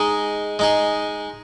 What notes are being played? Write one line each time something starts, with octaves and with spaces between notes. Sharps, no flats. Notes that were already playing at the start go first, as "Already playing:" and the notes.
Already playing: G#3 D#4 G#4
G#3 D#4 G#4